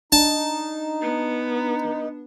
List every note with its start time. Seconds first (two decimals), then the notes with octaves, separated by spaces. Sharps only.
0.12 D4 D#4 A5
1.02 B3